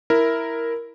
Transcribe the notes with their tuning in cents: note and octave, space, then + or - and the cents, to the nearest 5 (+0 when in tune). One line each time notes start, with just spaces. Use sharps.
E4 +0 A#4 +0